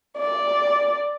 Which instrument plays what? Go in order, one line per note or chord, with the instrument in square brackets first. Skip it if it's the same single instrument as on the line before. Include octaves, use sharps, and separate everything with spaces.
[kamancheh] D5